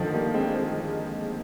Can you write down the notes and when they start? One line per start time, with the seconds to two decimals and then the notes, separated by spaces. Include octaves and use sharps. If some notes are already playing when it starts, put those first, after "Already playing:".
Already playing: D3 D#3 F3
0.13 G3 A#3
0.34 G#3 C4
0.54 G#3 C4